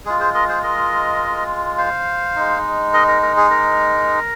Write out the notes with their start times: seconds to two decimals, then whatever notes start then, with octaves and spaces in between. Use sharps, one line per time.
0.06 G#3 F4 G#4
0.20 G#4 C5
0.34 A#4 D#5
0.48 G#4 C5
0.63 A#4 D#5
1.78 C5 F5
2.36 G#3 D#4
2.93 A#4 D#5
3.08 A#4
3.22 A#4
3.37 G#4
3.51 A#4